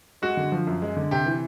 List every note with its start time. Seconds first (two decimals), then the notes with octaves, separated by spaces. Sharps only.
0.22 G#3 F#4
0.37 D3
0.52 F3
0.67 F#2
0.82 G#3
0.96 D3
1.11 C3 G4
1.26 E3